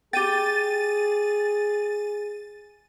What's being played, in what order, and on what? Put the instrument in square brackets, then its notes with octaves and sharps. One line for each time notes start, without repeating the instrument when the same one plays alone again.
[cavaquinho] G4 G5 [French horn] G#4 [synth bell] A6 D#7